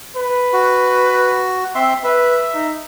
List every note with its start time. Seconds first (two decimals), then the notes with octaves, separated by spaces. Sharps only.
0.16 B4
0.53 F#4
1.75 C4 E5 C6
2.04 B4 E5
2.54 D#4